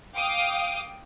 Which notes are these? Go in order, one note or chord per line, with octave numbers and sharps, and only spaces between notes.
F5 G5 D6 D#6